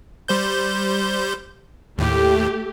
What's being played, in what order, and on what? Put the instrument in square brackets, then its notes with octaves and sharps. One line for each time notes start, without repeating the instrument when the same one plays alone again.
[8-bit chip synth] G3 C5 G6
[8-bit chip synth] D#2 A2 [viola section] A3 G4